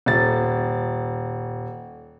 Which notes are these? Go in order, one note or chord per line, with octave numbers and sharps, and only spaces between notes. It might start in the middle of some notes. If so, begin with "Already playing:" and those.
D#1 A6